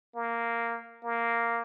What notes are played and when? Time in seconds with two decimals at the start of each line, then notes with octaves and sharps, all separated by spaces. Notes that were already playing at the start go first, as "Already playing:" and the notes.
0.16 A#3
1.04 A#3